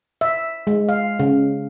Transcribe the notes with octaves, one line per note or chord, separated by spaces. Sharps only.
E5
G#3
F5
C#3